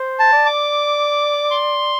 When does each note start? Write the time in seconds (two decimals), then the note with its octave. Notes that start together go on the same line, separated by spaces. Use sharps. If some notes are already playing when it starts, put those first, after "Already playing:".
Already playing: C5
0.19 A5
0.33 D5
0.46 D6
1.51 C6